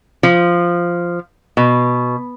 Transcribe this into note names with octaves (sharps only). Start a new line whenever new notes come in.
F3
B2